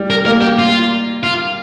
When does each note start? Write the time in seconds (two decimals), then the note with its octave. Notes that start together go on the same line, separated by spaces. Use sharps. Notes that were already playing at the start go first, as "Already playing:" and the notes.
Already playing: G3
0.10 A#4
0.25 A#3 A#4
0.41 G4
0.59 F4
1.23 F4